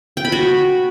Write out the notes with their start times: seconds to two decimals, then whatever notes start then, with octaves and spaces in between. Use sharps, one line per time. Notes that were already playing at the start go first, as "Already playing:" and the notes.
0.17 G5
0.25 B5
0.32 F#4